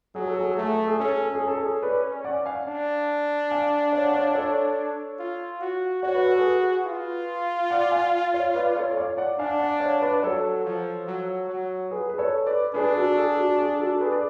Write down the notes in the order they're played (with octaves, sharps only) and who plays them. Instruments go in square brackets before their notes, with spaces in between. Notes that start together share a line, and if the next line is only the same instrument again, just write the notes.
[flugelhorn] F#3 [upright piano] G#4
[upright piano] A4
G#4
A4
[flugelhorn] A3
[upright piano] G#4
A4
G#4
[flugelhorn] C#4 [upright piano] A4
[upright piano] G#4
A4
G#4
[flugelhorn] C#4
[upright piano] A4
G#4
B4 D5
D5 F#5
F5 G#5
[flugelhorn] D4
[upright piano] F5 G#5
C#5 F5
F#5
C#5 F5
A4 C#5
[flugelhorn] F4
F#4
[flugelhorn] F#4 [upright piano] C#5
[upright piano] B4
A4
G#4 B4
[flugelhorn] F4
[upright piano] D5 F#5
F5 G#5
C#5 F5
B4 D5
A4 C#5
D5
C#5 F5
D5 F#5
[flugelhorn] D4 [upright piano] F5 G#5
[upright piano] D5 F#5
C#5 F5
B4 D5
[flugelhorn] F#3 [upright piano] A4 C#5
[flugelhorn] F3
F#3
F#3
[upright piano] G#4 B4
B4
A4 C#5
B4 D5
[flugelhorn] D4 [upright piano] G#4 B4
[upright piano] F#4 A4
A4
G#4
F#4
G#4
F#4 A4
G#4 B4
D5